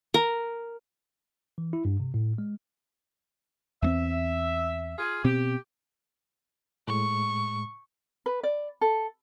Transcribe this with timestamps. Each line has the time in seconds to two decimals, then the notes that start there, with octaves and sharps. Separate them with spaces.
0.14 A#4
1.58 E3
1.73 E4
1.85 G2
2.00 C3
2.14 A2
2.38 G#3
3.82 E2 A#3 C4 E5
4.98 F4 G#4
5.24 B2 C4 G4
6.88 A2 G#3 C#6
8.26 B4
8.43 D5
8.81 A4